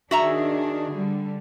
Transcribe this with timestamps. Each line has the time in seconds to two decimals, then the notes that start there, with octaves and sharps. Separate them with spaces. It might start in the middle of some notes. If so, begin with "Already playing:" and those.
0.11 D#3 D4 F#4 G#4 E5 A#5
0.94 D3 G3